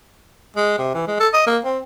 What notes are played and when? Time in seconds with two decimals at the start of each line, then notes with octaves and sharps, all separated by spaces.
0.56 G#3
0.78 C3
0.94 E3
1.07 G#3
1.20 A4
1.34 D#5
1.47 A#3
1.64 C4